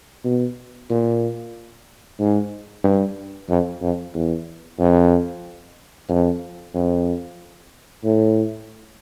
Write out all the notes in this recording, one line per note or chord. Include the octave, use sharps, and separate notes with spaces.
B2
A#2
G#2
G2
F2
F2
E2
F2
F2
F2
A2